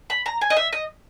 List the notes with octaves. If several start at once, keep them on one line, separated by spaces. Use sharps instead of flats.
B5
A#5
G#5
D#5
E5
D#5